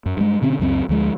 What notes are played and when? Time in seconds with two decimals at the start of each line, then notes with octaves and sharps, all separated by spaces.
0.06 F#2
0.17 G2 G#3
0.42 B2 D3 C4 C#4
0.59 C#2 F#2 F3 C4
0.89 D2 F3 G#3